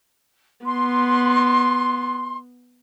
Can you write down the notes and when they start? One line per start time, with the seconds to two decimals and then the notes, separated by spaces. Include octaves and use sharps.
0.66 B3 C6